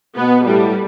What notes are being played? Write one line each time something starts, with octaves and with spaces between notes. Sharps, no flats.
B2 B3
A2 G3